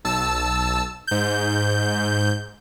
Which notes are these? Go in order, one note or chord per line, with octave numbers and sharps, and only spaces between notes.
B1 A5 E6
G#2 G6